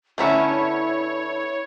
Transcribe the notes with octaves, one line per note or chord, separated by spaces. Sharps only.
D3 A3 B3 C#4 E4 A#4 C#5 E5